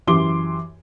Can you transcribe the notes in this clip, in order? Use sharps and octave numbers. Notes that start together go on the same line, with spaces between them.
F#2 E3 G4 C6 D6 G7